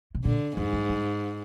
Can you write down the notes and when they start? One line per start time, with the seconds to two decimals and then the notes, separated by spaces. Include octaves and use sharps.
0.15 C3
0.25 A#2 D3
0.57 F2 G#2
0.73 G2
0.89 G2